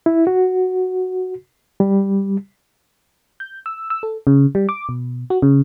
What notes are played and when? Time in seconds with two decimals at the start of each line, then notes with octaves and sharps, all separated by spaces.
0.06 E4
0.27 F#4
1.80 G3
3.40 G6
3.66 E6
3.90 E6
4.03 A4
4.27 C#3
4.55 G3
4.69 D6
4.89 B2
5.30 F#4
5.42 C#3